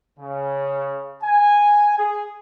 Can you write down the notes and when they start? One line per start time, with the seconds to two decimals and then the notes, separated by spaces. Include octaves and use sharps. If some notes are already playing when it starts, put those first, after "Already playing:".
0.20 C#3
1.24 G#5
1.99 G#4